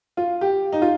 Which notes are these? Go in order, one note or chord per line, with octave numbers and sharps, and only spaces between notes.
F4
G4
D#4
F4